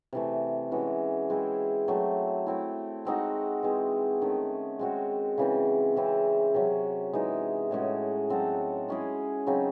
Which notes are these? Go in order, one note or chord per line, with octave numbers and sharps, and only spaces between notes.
C3 E3 A3
E3 G#3 C#4 F#4
G#3 C4 E4 G#4
F#3 A3 C4
A3 C4 E4
G#3 C4 D#4 F#4
E3 G#3 C4
D#3 A3 C#4
G#3 C4 F#4 C#5
C#3 E3 C4
C#3 E3 C4
C3 F#3 C#4
E3 G#3 D#4
A2 G#3 C#4 F#4
F#3 C4 F#4 A4
G#3 C#4 E4 G#4
C#3 F#3 C4 D#4